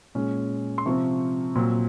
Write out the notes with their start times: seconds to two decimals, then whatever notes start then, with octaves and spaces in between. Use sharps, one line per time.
0.15 A#2 G#3 C#4
0.78 C6
0.86 C3 F3 C4 C#6
1.55 A#2 F#3 C4